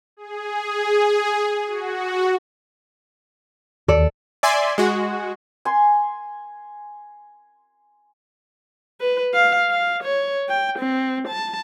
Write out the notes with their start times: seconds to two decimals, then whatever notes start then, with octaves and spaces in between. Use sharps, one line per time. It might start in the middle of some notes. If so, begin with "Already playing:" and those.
0.17 G#4
1.67 F#4
3.88 D#2 A4 D5
4.43 D5 E5 G#5 C6
4.78 G#3 F#4
5.65 G#5 C6
9.01 B4
9.34 F5
9.70 F5
10.03 C#5
10.49 G5
10.79 C4
11.28 A5